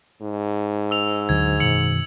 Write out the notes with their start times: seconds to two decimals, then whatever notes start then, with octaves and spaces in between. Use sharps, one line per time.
0.22 G#2
0.91 E6 F7
1.29 D2 D3 F#3 G#6
1.60 F#2 B2 D#3 E6 C#7 F#7